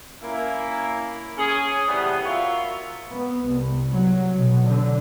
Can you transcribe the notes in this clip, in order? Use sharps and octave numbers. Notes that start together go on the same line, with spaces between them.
A#3 C#4 E4
C#4 G#4
A2 C3 E3 G3 B3
F4 F#4 A#4 C#5 E5
B3
C2
F#3
B2
D3